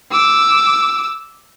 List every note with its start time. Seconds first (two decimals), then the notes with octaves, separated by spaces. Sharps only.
0.11 D6 E6